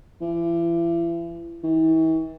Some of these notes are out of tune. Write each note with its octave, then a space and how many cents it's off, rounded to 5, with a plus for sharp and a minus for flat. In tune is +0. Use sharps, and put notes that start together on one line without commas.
E3 +35
E3 -45